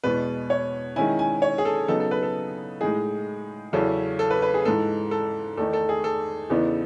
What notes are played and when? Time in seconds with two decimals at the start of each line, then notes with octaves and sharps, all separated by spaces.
0.04 E2 B2 G#3 B3 B4
0.50 C#5
0.96 D#3 G#3 C#4 E4 G#5
1.19 G#5
1.42 C#5
1.58 G#4
1.65 A4
1.88 C#3 F#3 B3 D#4 A4
2.00 A4
2.11 B4
2.23 A4
2.80 A2 G#3 D#4 G#4
3.73 E2 C#3 F#3 C#4 E4 A4
4.19 A4
4.30 B4
4.42 B4
4.54 G#4
4.65 G#2 E3 G#3 A4
5.11 A4
5.57 E2 D#3 A3 D#4 A4
5.73 A4
5.89 G#4
6.04 A4
6.50 E2 C#3 E3 B3 D#4